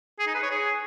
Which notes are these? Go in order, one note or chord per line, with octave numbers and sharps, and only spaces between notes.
G#4
D#4
B4
C#5
G#4